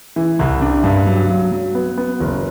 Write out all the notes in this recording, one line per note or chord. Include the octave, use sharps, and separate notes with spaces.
E3
C2
D4
G2
F#3
F#3
F#3
B3
B3
F#1